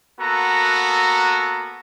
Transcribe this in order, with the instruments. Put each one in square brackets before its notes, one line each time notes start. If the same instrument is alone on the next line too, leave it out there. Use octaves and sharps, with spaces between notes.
[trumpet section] A#3 B3 F#4 A4 A#5